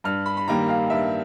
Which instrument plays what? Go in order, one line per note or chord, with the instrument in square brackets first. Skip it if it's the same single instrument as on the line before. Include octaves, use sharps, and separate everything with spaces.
[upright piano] G2 F6
B5
B5
D#3 G3 A#3 A#5
F5
G2 E5